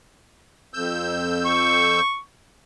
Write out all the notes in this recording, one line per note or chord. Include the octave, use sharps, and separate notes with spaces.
F2 E6 G6
C#6